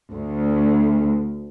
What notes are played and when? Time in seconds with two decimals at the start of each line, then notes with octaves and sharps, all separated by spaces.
0.14 D2